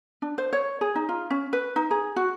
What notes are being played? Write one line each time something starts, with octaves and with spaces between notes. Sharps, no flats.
D4
C5
C#5
G#4
D#4
F4
C#4
B4
D#4
G#4
F#4